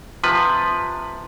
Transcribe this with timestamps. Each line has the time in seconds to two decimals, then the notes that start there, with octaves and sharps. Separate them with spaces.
0.24 C3 F3 B4